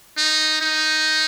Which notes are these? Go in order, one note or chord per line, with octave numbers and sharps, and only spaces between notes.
D#4
D#4